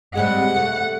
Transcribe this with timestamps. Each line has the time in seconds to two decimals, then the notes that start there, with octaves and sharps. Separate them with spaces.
0.15 C3 G3 G#3 F#5
0.56 A3